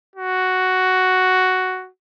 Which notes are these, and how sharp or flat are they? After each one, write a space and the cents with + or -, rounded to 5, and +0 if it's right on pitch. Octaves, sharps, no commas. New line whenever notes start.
F#4 +5